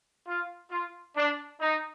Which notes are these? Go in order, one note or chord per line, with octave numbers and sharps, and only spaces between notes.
F4
F4
D4
D#4